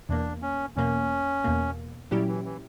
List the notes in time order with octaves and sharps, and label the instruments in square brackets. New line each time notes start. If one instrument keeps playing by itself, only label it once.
[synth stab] E2 B2 A#3 [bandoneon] D4
[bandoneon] C#4
[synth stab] E2 B2 A#3 [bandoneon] C#4
[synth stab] E2 B2 A#3
[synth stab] A#2 F#3 C#4 E4 G4 [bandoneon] G3
[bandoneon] E3
E3